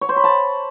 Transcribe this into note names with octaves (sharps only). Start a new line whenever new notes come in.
C#5
C5
B5
A5